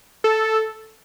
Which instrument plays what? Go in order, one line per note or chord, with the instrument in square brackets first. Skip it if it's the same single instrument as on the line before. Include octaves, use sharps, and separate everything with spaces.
[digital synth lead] A4